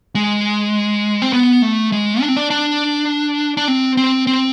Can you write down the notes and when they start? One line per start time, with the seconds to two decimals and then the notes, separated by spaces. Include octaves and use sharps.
0.15 G#3
1.22 C4
1.33 B3
1.62 A3
1.92 G#3
2.21 D4
2.29 C4
2.37 D4
2.50 D4
3.57 D4
3.68 C4
3.97 C4
4.27 C4